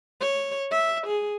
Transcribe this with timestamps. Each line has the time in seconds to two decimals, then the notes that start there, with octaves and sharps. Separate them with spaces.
0.21 C#5
0.71 E5
1.07 G#4